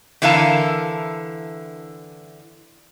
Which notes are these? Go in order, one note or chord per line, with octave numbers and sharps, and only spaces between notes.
D3 E3 E4 A#4 F5 A5